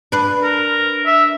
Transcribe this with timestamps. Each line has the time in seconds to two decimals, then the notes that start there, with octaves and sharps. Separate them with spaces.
0.12 D4 B4
0.43 A#4
1.06 E5